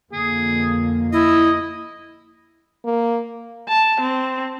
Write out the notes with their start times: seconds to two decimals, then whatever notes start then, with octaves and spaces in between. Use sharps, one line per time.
0.12 F2 D3 A#3 G#4
1.13 E4 D#5
2.85 A#3
3.68 A5
4.00 C4